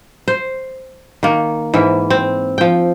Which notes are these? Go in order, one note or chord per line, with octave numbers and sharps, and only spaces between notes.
C5
D#3 A#3
G#2 E3 E5
C4
F3 G5